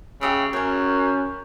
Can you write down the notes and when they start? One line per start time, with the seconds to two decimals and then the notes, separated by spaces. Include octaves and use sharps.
0.21 C#3 G4 D#5 E5
0.53 F#2 C#4 A#4 C#5